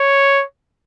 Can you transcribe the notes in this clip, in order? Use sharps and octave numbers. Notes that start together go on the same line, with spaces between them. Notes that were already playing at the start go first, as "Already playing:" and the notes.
Already playing: C#5